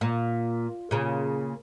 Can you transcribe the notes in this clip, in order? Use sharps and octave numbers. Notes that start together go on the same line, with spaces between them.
A#2
A#2 C#3